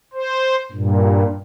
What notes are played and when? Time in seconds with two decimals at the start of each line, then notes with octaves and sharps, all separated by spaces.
0.13 C5
0.72 G2 A#2